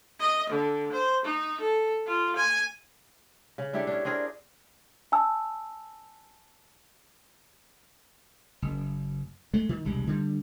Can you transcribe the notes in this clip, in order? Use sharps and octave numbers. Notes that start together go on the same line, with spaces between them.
D#5
D3
C5
D#4
A4
F4
G#5
C#3
D4 E4 G4 A4
C#4 D4
C4 D4 G#4 A#4
G#5 A5 E6
F#1
G#3 A3
D#3
E1 C2 G3 G#3
D3 G3